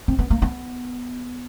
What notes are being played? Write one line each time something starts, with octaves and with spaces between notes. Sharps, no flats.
C4
B3
A#3
B3